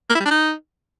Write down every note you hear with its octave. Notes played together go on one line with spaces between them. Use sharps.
A#3
E4
G3
D4
D#4